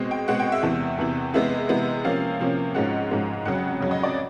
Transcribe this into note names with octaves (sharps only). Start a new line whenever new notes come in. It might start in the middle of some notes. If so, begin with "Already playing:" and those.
Already playing: B2 G#3 C4
G5
B2 G#3 C4 F#5
G5
E5
E2 C3 E3
E2 C3 E3
C3 E3 G#3 B3 E5
C3 E3 G#3 B3
C3 F3 A#3 C#4 F5
C3 F3 A#3 C#4
G#2 F3 G#3 C#4 F#5
G#2 F3 G#3 C#4
F2 C#3 F#3 F#5
F2 C#3 F#3
D#5
D5